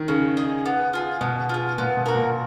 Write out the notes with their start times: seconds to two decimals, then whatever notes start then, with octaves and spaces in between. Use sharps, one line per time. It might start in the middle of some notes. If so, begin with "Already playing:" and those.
Already playing: D#3
0.08 C#3 C#4
0.37 G#4 D#5
0.66 B3
0.93 F4 G#4
1.21 B2 B3
1.49 F4 G#4
1.78 A#2 B3
1.97 B2
2.06 F#4 A#4
2.15 A#2